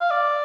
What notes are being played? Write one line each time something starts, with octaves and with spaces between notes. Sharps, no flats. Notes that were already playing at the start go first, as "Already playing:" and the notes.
F5
D5